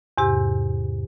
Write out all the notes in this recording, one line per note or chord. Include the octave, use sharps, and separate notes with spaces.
E2 G#2 C3 G4 E6